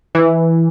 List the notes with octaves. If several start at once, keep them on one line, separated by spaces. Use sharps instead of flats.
E3